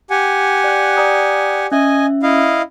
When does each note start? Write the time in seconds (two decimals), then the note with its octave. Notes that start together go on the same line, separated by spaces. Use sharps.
0.10 G4 F#5 G#5
0.64 D5 F#6
0.97 D5 A#5 D#6
1.72 C#4 D#5 E5 G#5
2.23 E4 D#5 F5